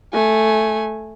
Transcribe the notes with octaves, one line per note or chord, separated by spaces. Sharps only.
A3 G#5